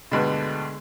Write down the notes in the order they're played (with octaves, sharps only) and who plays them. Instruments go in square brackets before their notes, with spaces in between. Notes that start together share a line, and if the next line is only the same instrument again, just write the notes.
[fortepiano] D2 G2 B2 [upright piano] D3 G#3 B3